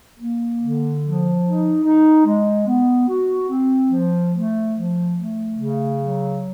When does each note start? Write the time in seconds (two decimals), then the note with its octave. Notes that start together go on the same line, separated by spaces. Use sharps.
0.18 A#3
0.60 D3
1.01 F3
1.42 D#4
1.84 D#4
2.25 G#3
2.67 B3
3.08 F#4
3.49 C4
3.90 F3
4.32 A3
4.74 F3
5.15 A3
5.56 C#3
5.98 F#3